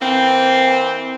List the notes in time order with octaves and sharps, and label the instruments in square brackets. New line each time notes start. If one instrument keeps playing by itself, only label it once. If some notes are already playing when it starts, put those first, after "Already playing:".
[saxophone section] E3 A#3 C4